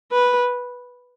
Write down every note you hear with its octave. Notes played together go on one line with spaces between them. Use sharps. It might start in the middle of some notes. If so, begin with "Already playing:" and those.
B4